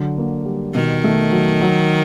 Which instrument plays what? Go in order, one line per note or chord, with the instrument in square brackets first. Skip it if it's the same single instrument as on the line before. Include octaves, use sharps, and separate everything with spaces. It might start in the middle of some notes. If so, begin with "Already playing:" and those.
Already playing: [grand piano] D3 F#3
A#3
G3
[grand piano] B2 [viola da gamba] D#3
[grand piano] A3
F#3
F#3